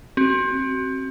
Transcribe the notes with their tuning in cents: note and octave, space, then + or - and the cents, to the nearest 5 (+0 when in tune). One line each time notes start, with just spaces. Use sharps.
C4 +25 F#4 +25